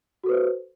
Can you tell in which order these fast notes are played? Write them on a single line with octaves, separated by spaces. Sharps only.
F#4 A4 B4 C5